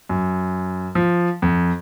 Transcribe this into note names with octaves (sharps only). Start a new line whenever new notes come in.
F#2
F3
F2